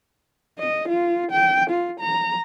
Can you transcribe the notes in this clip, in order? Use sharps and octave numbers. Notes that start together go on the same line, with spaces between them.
D#5
F4
G5
F4
A#5